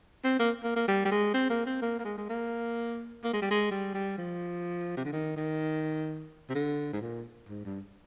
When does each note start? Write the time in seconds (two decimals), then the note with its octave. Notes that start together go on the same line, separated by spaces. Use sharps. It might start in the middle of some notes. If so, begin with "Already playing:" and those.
0.24 C4
0.39 A#3
0.64 A#3
0.76 A#3
0.88 G3
1.05 G3
1.11 G#3
1.34 C4
1.50 A#3
1.66 C4
1.82 A#3
1.99 A#3
2.05 G#3
2.18 G#3
2.29 A#3
3.24 A#3
3.33 G#3
3.42 G3
3.51 G#3
3.71 G3
3.94 G3
4.18 F3
4.97 C3
5.05 D3
5.12 D#3
5.37 D#3
6.49 C3
6.55 D3
6.93 G#2
7.01 A#2
7.49 G#2
7.65 G2